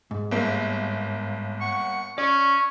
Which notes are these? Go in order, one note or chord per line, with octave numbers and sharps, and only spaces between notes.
G#2
G1 A#3
F#5 C#6
C#4 D5 C#6